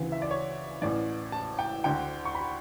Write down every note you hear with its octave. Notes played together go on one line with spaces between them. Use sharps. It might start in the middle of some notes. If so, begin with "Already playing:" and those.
Already playing: D2 C#3 E3
E5
D5
C#5
A1 A2 E3 D5
A5
G5
D2 D3 G5
C#6
B5